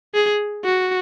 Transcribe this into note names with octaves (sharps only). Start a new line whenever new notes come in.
G#4
F#4